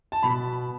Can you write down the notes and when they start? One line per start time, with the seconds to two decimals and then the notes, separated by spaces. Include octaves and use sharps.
0.12 A5
0.23 B2 B5